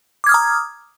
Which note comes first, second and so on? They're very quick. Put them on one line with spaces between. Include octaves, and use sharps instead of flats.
D6 G#6 F6 D#6 A#5